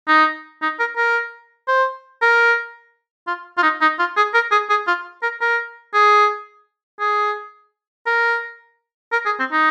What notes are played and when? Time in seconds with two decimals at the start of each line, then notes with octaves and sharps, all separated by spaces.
0.08 D#4
0.62 D#4
0.80 A#4
0.97 A#4
1.68 C5
2.22 A#4
3.28 F4
3.58 F4
3.63 D#4
3.81 D#4
3.99 F4
4.17 G#4
4.34 A#4
4.52 G#4
4.70 G#4
4.87 F4
5.23 A#4
5.41 A#4
5.94 G#4
7.00 G#4
8.06 A#4
9.12 A#4
9.26 G#4
9.39 C4
9.52 D#4